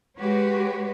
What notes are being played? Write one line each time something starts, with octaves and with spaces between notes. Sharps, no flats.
G#3 F#4 G4 B4 C#5